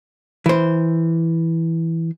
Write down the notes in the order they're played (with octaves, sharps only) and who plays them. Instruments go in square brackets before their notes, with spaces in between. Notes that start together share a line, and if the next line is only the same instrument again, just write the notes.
[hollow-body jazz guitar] E3 C5